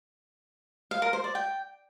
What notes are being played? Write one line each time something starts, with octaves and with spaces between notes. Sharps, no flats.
F5
A#4
C5
D5
G5